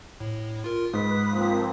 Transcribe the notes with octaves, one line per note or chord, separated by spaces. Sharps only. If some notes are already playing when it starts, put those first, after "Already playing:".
A2
F4 A#4
G#2 B4 D#6 B6
F3 A#3 C4